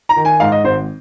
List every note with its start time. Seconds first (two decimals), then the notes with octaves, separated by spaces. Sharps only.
0.09 A#5
0.17 D#3
0.25 G#5
0.40 G#2 F5
0.52 D#5
0.64 G#1 C5